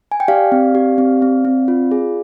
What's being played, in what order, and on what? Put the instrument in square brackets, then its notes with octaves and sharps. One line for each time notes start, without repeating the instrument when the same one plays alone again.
[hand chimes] G#5
G5
G4 D5 F5
C4
G4
C4
C4
C4
F4
G#4